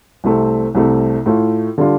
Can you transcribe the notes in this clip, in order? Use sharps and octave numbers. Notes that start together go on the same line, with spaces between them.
C2 C3 A3 C4
C2 C3 A3
A2 A3 F4
D3 G3 D4 F4